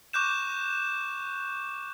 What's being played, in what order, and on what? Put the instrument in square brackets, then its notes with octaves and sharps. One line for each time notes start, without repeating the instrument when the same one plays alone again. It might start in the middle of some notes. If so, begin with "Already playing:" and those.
[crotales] C#6 D6 F#6 G6 E7